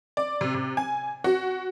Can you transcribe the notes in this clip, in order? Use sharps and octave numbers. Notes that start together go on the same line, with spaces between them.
D5
C3
C3
G#5
F#4